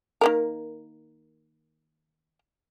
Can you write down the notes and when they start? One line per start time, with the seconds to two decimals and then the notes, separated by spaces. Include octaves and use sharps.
0.21 D#3 A#3 A#4